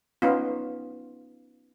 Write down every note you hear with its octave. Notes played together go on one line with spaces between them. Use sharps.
B3 C#4 D#4 F4